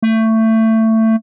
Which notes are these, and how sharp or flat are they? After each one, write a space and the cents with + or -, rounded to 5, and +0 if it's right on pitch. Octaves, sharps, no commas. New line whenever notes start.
A3 +20